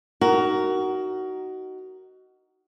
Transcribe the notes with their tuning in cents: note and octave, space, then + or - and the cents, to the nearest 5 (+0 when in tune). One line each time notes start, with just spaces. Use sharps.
D#4 +0 F#4 +20 A#4 +0